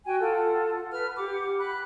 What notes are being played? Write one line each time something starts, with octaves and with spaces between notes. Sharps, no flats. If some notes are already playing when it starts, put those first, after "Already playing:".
F#4 G5 G#5
F4 A4 F#5
B4 F6
G4 F#5 D6
B5 F#6